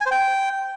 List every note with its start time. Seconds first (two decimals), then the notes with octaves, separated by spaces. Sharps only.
0.01 G#5
0.06 C5
0.11 G5